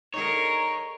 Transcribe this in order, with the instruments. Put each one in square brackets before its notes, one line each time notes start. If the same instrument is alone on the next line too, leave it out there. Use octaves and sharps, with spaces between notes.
[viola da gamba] D3 G#4 A#4 [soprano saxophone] D#4 [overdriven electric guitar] C#5